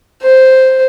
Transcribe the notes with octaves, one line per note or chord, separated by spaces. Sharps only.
C5